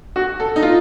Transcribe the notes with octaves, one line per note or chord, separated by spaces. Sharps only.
F#4
A4
D#4
F4